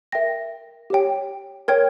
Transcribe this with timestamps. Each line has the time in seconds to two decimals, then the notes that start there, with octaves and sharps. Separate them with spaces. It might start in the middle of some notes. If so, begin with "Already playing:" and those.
0.12 A#4 E5 G5 A#6
0.90 G4 C#5 G5
1.68 A#4 C#5 G5 G#6